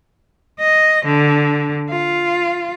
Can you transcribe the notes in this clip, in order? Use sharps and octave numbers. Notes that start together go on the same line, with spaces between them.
D#5
D3
F4